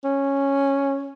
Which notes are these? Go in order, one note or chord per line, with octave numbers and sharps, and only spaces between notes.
C#4